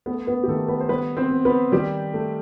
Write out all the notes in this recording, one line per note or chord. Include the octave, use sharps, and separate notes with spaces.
A3 B3 B4
B3 B4
G4
D#3 A3 A4
B3 B4
C5
G3 B3 B4
C4 C5
B3
B3 B4
D#3 G3 G4
A3